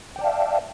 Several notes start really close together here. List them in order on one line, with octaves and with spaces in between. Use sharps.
G5 D5 A5 F5 E5